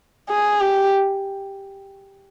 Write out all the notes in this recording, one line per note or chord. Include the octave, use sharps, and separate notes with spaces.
G#4
G4